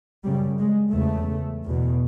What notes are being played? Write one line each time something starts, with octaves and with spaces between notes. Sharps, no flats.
F#2 C#3 G3
G#3
E2 C#3 A3
E2 B2